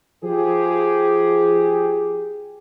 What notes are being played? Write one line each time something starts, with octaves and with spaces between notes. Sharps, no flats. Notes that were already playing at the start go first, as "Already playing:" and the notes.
F3 G4 G#4